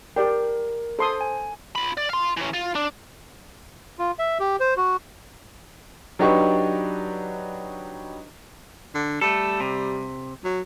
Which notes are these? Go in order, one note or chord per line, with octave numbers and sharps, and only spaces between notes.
G4 A#4 D5 G5
A4 C5 C6 D#6
G#5
F4 B5
D5
F5 C6
E3 C#4
F4
D4
F4
E5
G4
C5
F#4
F#3 D4 D#4 G4 B4 C#6
D3
G3 A3 A4
C3
F#3